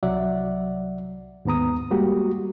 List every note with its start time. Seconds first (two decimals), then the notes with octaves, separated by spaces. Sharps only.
0.03 C2 F#3 D5 E5 F#5
1.45 D#2 G#2 B3 A#5 D#6
1.91 G3 G#3 A#3 F#4 G4